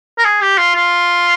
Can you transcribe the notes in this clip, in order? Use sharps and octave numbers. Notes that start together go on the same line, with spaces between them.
A#4
G#4
G4
F4
F4